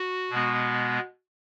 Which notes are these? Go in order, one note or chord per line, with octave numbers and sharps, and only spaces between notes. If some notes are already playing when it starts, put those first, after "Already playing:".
Already playing: F#4
B2 G#3 B3